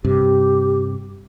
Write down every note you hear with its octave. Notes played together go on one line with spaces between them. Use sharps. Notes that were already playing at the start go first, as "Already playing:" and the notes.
G2 C3 G4